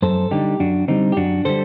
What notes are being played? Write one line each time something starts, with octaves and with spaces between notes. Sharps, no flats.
F#2 A4 C5
D3 G3 D#4 G4
F#2 D4 F#4
D3 G3 C4 D#4
G4
F#2 D4 F#4
D3 G3 A4 C5